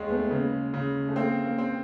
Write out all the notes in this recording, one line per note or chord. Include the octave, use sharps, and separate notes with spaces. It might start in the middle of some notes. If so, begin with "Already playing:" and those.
Already playing: D#2 G#3
A3 B3
C#3 A#3
C#3
A3
A#3 C4
A#3
C4